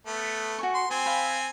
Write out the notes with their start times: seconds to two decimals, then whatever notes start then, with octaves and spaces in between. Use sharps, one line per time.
0.07 A3 B3
0.59 F#4 G#5 C#6
0.75 C6
0.91 C4 G#5 C6
1.06 F5 G5 B5